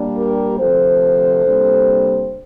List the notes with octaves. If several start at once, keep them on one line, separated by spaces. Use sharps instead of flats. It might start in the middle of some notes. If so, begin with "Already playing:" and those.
Already playing: A#2 G3 A#3 D4
G4 A#4
D2 C3 F3 C4 A4 C5
C3 G3 A#3 D4